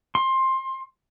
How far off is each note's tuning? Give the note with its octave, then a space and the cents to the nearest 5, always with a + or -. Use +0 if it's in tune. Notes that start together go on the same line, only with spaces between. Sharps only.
C6 +20